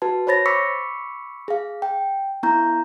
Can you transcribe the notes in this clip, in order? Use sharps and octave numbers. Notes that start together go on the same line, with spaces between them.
F#4 B4 A5
C5 C#5 B5 A6 A#6
B5 C#6 D6 E6 B6 C#7
G#4 F5
G5
B3 E4 A#5 G6